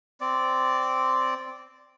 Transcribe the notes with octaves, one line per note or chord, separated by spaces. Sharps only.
C4 D5